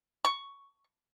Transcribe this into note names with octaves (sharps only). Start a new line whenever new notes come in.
C#6